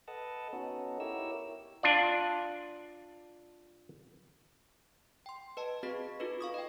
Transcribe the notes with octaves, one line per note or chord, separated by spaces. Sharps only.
A4 B4 D#5 F#5 A5
B3 C#4 D#4 F#4 A4
E4 G4 A#4 C#5 E6
D4 F4 D5
G5 C6
B4 D#5 A5
C4 F#4 G#4 D#5 C#6 B6
D#4 F4 F#4 A4 B4 D#5
F5 C#6 D#6
D#5 G5